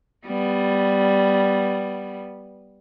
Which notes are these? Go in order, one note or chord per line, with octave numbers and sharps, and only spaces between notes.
G3 B3